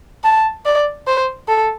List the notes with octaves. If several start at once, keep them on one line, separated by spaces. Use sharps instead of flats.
A5
D5
C5
A4